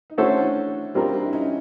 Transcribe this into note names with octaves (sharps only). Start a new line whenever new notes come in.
D#4
A3 C#4 D4 E4 F#4 A4 C5
D4
G3 C4 D4 F4 A#4
D4
E4
C#4 D#4